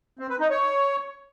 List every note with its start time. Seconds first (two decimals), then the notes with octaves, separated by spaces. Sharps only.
0.19 C4
0.30 B4
0.40 D#4
0.50 C#5